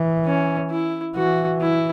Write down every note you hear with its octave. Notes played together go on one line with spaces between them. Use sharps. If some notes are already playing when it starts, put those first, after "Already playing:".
Already playing: E3
C#4
E4
E3 F#4
E4